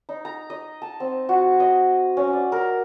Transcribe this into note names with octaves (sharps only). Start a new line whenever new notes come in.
D#4
A#5
D#5
A5
C4
F#4
D#5
C#4
D5
A#4